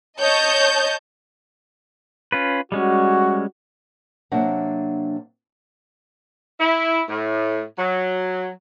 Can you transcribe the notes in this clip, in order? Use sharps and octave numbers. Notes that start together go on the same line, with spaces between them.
C#5 D#5 A5 G6
C#4 F4 B4
G3 G#3 C#4 F#4
C3 F#3 A#3 D4 F#5
E4
A2
F#3